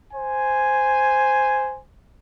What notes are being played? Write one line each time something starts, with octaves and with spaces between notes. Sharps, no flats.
C5 G#5